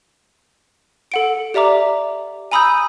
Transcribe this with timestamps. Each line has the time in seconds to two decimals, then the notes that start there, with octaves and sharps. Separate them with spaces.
1.12 A4 F#5 D7
1.54 G4 D5 E5 A#5 D6
2.52 G#5 A#5 B5 D#6 E6 G6